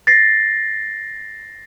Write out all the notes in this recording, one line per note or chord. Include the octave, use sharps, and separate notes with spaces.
A6 A#6 C7